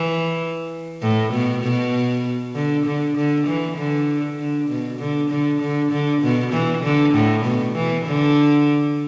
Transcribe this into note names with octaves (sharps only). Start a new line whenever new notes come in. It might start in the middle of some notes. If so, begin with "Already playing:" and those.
Already playing: E3
A2
B2
B2
D3
D3
D3
E3
D3
D3
B2
D3
D3
D3
D3
B2
E3
D3
A2
B2
E3
D3